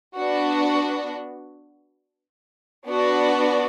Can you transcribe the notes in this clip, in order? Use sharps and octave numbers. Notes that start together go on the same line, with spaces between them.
B3 D4 F#4
B3 D4 F#4 D5